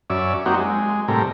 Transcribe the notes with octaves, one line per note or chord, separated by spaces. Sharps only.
F#2 C#4 D5 E5
F#3 A#3 C4 D#4 F#4 G4
G#3
A2 C3 G3 A#4